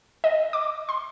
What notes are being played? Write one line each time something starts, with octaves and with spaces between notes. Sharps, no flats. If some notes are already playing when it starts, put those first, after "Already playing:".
D#5
D6
C6